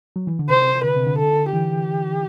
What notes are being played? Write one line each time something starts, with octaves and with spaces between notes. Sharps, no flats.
F#3
E3
D3
C3 C5
D3 B4
C3
D3
A4
E3 G4